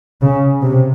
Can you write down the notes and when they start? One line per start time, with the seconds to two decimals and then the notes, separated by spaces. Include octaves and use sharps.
0.22 C#3
0.63 C3